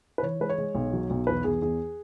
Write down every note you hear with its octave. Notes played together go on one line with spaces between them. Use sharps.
B4
E3 C#5
G#3 B4
C#5
G#3
B1
F#3
B1
E2 B4
E2 G#4
E2 G#4